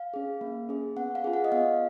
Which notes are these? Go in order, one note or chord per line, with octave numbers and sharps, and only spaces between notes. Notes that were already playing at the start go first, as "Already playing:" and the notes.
Already playing: F5
C#4 G#4
A#3
C#4 G#4
B3 F#5
F5
F4 G#4
F#5
D#5
B3 F5